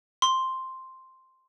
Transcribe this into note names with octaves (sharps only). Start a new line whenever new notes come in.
C6